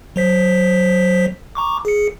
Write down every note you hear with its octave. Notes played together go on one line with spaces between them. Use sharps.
F#3 C5 B6
A#5 C#6 D6
G#4 C#7